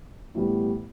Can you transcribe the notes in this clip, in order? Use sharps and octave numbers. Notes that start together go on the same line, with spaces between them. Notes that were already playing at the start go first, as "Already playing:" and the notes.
A2 E3 G3 B3